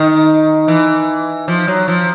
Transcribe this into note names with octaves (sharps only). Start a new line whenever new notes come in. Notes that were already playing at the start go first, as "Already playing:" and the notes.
Already playing: D#3
E3
F3
F#3
F3